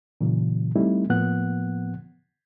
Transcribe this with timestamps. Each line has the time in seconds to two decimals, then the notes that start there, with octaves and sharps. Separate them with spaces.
0.21 A#2 C#3 E3 F#3
0.76 G3 A3 C4 D#4 E4
1.10 A2 F3 A#3 B3 F#5 F#6